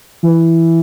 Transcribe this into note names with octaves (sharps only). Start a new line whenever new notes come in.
E3